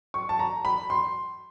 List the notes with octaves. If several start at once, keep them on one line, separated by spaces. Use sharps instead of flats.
C#6
A5
A#5
B5
C6